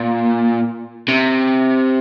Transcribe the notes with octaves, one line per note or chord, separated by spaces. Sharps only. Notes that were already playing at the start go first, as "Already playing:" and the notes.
Already playing: A#2
C3